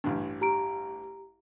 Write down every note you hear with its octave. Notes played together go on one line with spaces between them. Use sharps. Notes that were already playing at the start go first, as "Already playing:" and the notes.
A1 G2
G4 A#5 D7